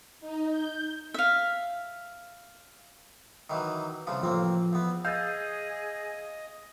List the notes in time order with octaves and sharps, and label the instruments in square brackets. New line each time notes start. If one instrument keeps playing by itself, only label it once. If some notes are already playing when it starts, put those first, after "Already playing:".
[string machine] D#4
G6
[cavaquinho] E5 F5
[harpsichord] D#3 E3 F#3
C2 C#3 F3
[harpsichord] A1 A#3 C4 [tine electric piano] F3
[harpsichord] E2 B3
[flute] G#4 [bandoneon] D#5 [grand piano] F5 E6 [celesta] G6 A6